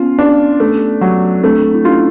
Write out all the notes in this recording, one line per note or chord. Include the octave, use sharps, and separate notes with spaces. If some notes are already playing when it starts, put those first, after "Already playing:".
Already playing: B3 C#4 F4
D4
A3
F#3
A3 C4 D4
E4
C#4 D#4 F4